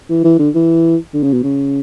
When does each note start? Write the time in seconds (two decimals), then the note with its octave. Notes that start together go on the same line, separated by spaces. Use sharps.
0.09 E3
0.24 E3
0.39 D3
0.55 E3
1.14 D3
1.23 C#3
1.33 B2
1.43 C#3